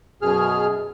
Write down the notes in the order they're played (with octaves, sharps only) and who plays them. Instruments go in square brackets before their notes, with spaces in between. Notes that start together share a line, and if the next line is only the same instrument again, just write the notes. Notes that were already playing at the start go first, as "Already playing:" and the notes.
[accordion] F#2 B2 G#4 F6